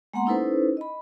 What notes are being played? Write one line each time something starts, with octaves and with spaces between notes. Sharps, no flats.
G#3 A#3 B3 F#5 A#5 C6
C#4 D#4 E4 A4 B4 C5
D#5 B5